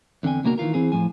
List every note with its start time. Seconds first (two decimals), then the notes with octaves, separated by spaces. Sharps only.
0.23 E2 D3 C4 G5 G#5
0.44 C#2 B2 A#3 D4 F#4 A#4
0.58 D#3 E3 F4 A#4
0.74 E3 C4 G#4
0.92 A2 F3 G#5